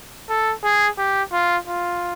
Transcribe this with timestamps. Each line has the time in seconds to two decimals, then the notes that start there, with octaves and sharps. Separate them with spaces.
0.30 A4
0.64 G#4
0.98 G4
1.33 F4
1.67 F4